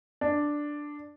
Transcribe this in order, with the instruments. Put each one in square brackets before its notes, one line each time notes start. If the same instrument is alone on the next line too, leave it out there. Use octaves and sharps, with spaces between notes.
[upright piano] D4